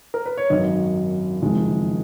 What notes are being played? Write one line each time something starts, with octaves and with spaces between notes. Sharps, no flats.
A#4
B4
C#5
G#1 F#2 D#3 F#3 D#5
F#1 F2 D#3 G#3